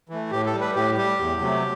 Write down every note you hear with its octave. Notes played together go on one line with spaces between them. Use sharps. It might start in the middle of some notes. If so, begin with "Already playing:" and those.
E3 A3
A2 G4
A4
G3
B4
A2 G4
G3 G4
E2
C3 F#3 A3